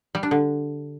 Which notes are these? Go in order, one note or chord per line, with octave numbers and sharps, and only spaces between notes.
G3
D4
D3